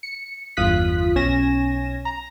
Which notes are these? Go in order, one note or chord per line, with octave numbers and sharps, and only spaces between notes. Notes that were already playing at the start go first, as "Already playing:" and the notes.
C#7
G1 E2 F4 D#6 F#6 B6
B1 C#4 G#5 A#6 E7
A#5